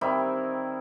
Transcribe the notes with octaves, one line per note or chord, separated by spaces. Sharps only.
D#3 G3 C4 E4